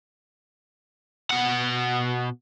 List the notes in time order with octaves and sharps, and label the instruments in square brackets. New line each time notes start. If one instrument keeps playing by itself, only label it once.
[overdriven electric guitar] B2 F#5